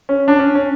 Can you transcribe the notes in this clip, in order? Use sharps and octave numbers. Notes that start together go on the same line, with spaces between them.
C#4
D4
C#4
C#4